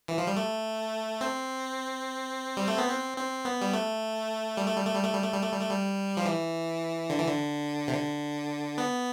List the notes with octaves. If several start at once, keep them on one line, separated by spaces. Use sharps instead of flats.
E3
F3
G3
A3
C4
G3
A3
B3
C4
C4
B3
G3
A3
G3
A3
G3
A3
G3
A3
G3
A3
G3
A3
G3
A3
G3
F3
E3
D3
E3
D3
C3
D3
B3